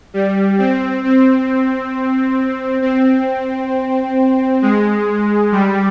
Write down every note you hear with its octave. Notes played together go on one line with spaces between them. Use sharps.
G3
C4
C4
C4
G#3
G3